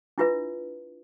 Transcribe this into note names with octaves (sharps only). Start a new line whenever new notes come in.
D4 E4 F4 B4 E5